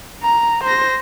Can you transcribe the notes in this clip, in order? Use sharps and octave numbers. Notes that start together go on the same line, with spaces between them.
A#5
C5 A#6